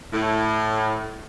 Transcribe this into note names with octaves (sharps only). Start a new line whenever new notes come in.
A2